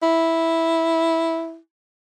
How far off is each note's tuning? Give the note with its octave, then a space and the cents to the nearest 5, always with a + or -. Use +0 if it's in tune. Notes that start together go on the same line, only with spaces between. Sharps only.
E4 -5